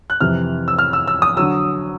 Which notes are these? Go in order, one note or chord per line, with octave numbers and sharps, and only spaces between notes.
F#6
F2 C3 E3 F6
E6
F6
E6
E6
D#6
D3 F#3 E6